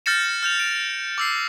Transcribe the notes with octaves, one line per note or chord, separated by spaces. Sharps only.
F6 G6 A6 A#6 C#7 E7
F6 G6 F7
D7
D6 E6 C7